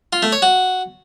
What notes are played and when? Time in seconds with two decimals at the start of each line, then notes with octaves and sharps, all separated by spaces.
0.13 F4
0.23 A3
0.32 C#5
0.42 F#4